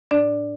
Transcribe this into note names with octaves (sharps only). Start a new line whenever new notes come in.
A2 D4 D5